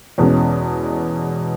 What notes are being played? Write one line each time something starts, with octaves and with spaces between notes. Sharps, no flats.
E2 B2 G#3 C#4